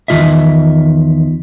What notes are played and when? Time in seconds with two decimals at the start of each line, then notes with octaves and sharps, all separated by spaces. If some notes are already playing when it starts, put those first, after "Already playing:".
0.08 E2 D#3 F3 F4 D#5 E5